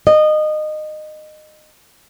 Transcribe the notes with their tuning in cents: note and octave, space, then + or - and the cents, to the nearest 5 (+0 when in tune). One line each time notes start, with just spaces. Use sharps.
D#5 -20